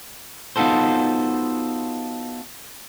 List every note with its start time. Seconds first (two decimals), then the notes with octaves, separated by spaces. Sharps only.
0.56 B3 D#4 F4 F#4 A4 C5